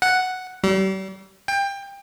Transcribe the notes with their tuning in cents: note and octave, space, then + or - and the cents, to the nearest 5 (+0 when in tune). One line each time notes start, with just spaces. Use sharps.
F#5 +0
G3 -40
G5 +25